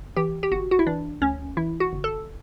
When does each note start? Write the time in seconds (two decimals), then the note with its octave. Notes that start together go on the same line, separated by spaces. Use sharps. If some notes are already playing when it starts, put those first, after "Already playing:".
Already playing: G1
0.17 E3 G4
0.43 G4
0.52 G1 F#4
0.71 F#4
0.79 E4
0.87 E3 D4
1.21 D2 C#4
1.57 E3 E4
1.80 F#4
1.93 G1
2.04 A4